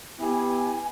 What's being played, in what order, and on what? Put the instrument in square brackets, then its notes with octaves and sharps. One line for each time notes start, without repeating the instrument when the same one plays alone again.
[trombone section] B3 E4 G4 [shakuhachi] G#5